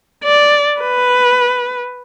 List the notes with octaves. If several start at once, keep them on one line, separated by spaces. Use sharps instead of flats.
D5
B4